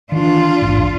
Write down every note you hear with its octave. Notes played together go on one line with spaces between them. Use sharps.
D#3 E3 D4 F4
E1 A1 G#2